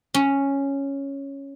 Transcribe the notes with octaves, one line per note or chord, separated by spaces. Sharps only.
C#4